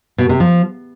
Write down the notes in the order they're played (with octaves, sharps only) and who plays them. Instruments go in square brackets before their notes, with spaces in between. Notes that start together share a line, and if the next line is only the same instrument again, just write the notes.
[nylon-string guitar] B2
C3
F3